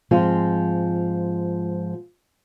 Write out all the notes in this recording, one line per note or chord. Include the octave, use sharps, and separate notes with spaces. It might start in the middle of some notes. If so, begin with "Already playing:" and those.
G#2 F3 G#3 C4 F4